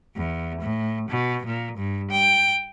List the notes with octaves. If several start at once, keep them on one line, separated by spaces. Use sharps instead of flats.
E2
A2
B2
A#2
G2
G5